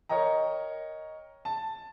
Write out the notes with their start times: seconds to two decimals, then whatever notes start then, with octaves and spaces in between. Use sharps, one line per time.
0.09 A#4 C#5 D#5 G5 A#5
1.45 A5